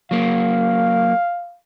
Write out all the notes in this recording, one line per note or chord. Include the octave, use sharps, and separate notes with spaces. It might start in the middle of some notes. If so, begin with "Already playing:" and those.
F#3 A#3 F5